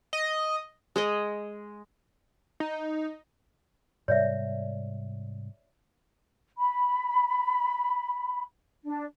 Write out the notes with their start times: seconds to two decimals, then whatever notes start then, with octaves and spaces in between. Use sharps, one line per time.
0.13 D#5
0.96 G#3 G#4 D#5
2.60 D#4
4.08 G#2 C3 G3 C#5 D5 E5
6.58 B5
8.85 D4